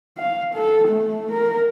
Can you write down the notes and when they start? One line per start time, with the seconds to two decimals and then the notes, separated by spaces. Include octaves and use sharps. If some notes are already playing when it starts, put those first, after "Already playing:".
0.18 F5
0.54 A4
0.88 A3
1.32 A#4